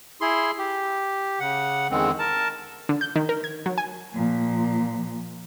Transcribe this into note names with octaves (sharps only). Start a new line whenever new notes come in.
E4 G#4 C6
G4
C#3 F#5
E2 D3 D#3 G#3 C4
A#4 A5
D3
G6
D#3
A#4
G#6
F#3
G#5
A#2 F3